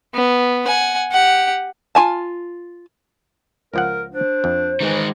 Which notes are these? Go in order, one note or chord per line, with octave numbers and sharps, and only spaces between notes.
B3
F#5 G#5
G4 F#5
F4 G#5 A5
C#2 F3 A#4 F#5
D4 C5
F2
D#3 E3 G#3